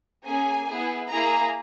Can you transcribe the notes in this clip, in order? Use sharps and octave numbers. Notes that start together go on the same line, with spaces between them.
A#3 C#4 G#4 G#5
B3 E4 G#4
A#3 E4 G#4 A#5